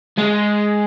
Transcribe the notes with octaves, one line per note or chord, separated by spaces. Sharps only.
G#3